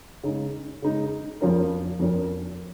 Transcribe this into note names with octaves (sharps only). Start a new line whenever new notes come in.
C#3 G#3 D#4
C#3 G#3 D#4
F2 F3 C#4 F4 A#4
F2 F3 C#4 F4 A#4